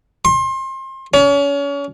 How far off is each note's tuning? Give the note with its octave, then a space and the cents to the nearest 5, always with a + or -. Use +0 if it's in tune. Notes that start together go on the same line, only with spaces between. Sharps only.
C6 +30
C#4 +35